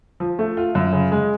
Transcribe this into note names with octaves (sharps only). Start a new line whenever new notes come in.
F3
A3
F4
F#2
C#3
G#3